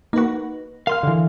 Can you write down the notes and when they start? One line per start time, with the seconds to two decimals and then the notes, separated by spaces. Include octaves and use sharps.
0.13 A#3 D#4 F#4 B4
0.87 A#4 F5 C6 F6
1.03 D3 E3